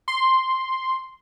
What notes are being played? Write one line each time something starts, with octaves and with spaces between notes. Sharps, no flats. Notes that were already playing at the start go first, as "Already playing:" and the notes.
C6